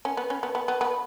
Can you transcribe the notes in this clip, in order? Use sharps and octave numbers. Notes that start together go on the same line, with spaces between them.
C#4
B3
C#4
B3
B3
B3
B3